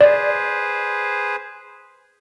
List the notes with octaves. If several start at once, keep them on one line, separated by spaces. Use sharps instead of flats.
G#4 B4 C5 D5